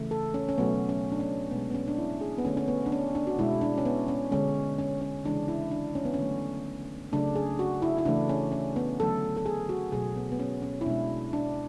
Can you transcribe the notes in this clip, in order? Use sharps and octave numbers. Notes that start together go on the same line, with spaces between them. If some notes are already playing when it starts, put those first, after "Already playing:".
Already playing: C#3 E3 A3
A4
C#4
C#4
B2 F#3 A3 B3
C#4
D4
C#4
B2 G#3 B3
B3
C#4
D4
E4
G#4
B3
D3 A3 C#4
C#4
B3
D4
C#4
D4
F#4
B2 G#3 E4
D4
C#4
B3
C#4
D3 G#3 C#4
C#4
C#4
C#3 E3 G#3 D4
E4
D4
C#4
B3
C#4
D3 F#3 A3
C#3 F#3 A3 D4
G#4
F#4
E4
E4
C#3 E3 A3 D4
C#4
C#4
B3
D3 F#3 A3 A4
A4
G#4
F#4
B2 F#3 A3 G#4
B3
B3
C#4
C#4
E4
B2 G#3 D4
D4